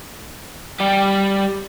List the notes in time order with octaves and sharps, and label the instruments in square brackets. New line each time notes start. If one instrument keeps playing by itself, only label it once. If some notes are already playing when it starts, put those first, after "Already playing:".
[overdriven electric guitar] G3 G4